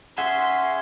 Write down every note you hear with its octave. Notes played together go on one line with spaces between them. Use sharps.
C#4 G#4 E5 F#5 C6